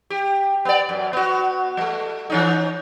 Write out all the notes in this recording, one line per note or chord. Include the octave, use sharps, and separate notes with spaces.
G4
B3 D5
F#2
B3 F#4
G3 A3
E3 C#4 D#4